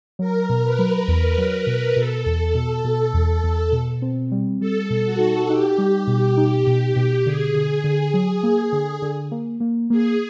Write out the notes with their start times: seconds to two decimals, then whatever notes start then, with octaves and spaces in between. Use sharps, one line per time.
0.19 F#3 A#4
0.49 B2
0.64 B4
0.79 F#3
1.08 E2 A#4
1.37 F#3 B4
1.66 B2 B4
1.96 B2 A4
2.26 E2
2.54 B2
2.84 B2
3.14 E2
3.43 E2
3.72 B2
4.02 C4
4.31 G3
4.60 G3 A4
4.90 B2
5.05 F#4
5.19 D#4
5.49 D#4 G4
5.78 G3
6.07 B2
6.37 D#4
6.67 B2
6.96 B2
7.25 D3 G#4
7.55 D3
7.84 D3
8.14 F#3
8.43 A#3
8.72 D3
9.02 D3
9.31 A#3
9.60 A#3
9.90 A#3 G#4